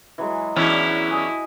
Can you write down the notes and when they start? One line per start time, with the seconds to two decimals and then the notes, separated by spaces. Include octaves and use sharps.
0.18 E3 F#3 G#3
0.56 E2 C#4 D4 E4 F#4 E5
1.10 G#4 D#5